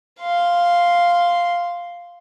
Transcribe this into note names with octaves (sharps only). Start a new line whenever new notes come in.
F5 C6